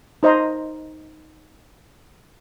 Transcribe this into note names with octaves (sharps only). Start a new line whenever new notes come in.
D#4 C5 D#5 A#5 C6